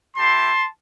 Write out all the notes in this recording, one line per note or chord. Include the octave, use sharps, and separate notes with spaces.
A3 E4 G4 A5 C6